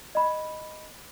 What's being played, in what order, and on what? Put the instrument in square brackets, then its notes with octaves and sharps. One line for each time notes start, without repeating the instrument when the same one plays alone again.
[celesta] D#5 B5